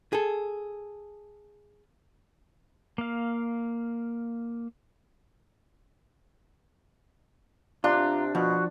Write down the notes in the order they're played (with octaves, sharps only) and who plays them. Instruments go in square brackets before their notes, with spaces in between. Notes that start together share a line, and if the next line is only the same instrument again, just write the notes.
[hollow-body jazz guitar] G#4 A4
[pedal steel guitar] A#3 F5
[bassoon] C3 [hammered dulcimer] D4 [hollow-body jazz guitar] F4 [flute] A#5
[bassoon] B2 [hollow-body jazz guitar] F3 [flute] F#4